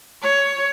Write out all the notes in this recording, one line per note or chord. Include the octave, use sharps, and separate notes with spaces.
C#5